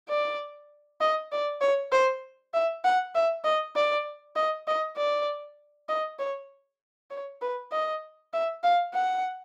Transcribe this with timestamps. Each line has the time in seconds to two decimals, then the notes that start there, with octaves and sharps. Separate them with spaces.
0.09 D5
1.01 D#5
1.32 D5
1.61 C#5
1.92 C5
2.53 E5
2.84 F#5
3.15 E5
3.44 D#5
3.76 D5
4.36 D#5
4.67 D#5
4.97 D5
5.89 D#5
6.19 C#5
7.10 C#5
7.41 B4
7.72 D#5
8.33 E5
8.63 F5
8.94 F#5